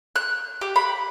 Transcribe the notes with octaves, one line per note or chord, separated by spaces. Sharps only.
F#6
G4
B5